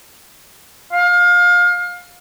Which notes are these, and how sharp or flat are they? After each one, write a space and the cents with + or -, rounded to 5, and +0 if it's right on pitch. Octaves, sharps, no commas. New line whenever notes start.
F5 +25